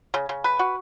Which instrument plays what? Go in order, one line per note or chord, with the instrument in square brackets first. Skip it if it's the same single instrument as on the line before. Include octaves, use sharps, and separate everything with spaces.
[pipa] C#3
C#3
B4
F#4